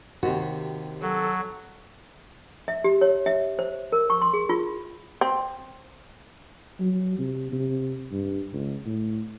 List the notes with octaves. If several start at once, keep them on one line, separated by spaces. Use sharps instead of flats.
D#2 C3 F#4
F#3 A4
E5
G4
C#5
E5
C5
A#4
C#6
C6
G#4
F4
C4
F#3
C3
C3
G2
C#2
A2